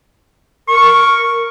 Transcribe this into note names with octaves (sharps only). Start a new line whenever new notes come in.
A#4 C#6